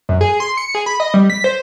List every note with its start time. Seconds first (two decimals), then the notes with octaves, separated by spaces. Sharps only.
0.09 F#2
0.21 G#4
0.40 C6
0.57 C#7
0.75 G#4
0.86 B5
1.00 D#5
1.14 G3
1.30 B6
1.44 C5